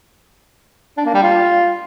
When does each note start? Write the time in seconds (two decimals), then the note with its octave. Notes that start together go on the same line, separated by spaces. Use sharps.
0.97 D4
1.06 A#3
1.14 G3
1.23 F4